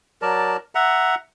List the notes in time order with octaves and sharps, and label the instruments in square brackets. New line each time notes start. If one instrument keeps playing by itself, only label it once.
[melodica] F#3 A#4 D5 A5
E5 F#5 A#5